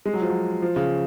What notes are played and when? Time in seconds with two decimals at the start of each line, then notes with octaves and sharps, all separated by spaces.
0.06 G#3
0.14 F#3
0.22 F3
0.29 F#3
0.62 F3
0.76 C#3